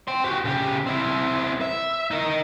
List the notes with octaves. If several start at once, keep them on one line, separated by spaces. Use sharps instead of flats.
G5 C6
F#4 G4
C#3 G4
C4 E4
E5
D#4 A#4